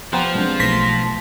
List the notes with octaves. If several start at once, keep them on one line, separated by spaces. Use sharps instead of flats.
F3 B3 G4 C5 G5 A#5 F#6
G#3 C4 D4
B1 A3 B3 C6 A#6 B6